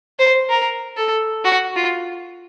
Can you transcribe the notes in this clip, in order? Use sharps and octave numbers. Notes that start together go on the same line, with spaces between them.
C5
A#4
A4
F#4
F4